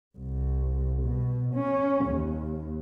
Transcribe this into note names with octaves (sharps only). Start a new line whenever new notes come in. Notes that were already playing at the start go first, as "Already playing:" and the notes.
C2
B2
C#4
D#2